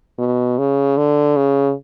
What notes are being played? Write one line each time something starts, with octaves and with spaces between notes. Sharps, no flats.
B2
C#3
D3
C#3